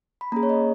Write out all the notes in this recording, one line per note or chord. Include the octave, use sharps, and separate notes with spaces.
B5
A#3 C#4 G#4 A#5
C#5
D#5